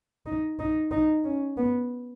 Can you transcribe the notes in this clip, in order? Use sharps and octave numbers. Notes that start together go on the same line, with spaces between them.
D#4
D#4
D#4
C#4
B3